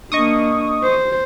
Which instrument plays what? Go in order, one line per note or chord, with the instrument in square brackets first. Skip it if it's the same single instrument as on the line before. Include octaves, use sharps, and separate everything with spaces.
[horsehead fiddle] A#3 D4 [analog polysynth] D#5 C#6 D#6
[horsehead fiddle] C5